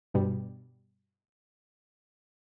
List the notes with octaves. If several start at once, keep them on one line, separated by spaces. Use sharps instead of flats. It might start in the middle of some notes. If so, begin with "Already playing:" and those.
G2 B2 G3